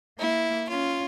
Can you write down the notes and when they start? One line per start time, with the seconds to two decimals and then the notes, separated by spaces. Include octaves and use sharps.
0.19 A#3 E4
0.69 C#4 F4